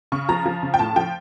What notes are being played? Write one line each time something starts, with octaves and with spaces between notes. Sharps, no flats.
C#3 C#6
F3 A#5
F3
C#3
G5
A2 A5
F3 G5